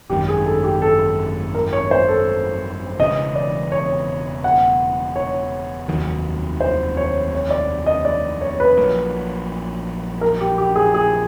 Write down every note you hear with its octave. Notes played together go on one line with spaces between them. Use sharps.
G#1 F#2 D#3 G4
G#4
A4
G4
A4
A#4
C#5
C5
A4
E1 E2 C#3 E3 D#5
D5
C#5
F#5
C#5
F1 D#2 D#3 F#3
C5
C#5
C#5
D5
D#5
D5
C#5
B4
A#1 A#2 F#3
A#4
G4
G4
G#4
G#4